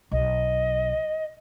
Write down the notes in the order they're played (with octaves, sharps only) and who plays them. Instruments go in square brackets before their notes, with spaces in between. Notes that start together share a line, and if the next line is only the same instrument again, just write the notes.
[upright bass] B1 [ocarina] D#5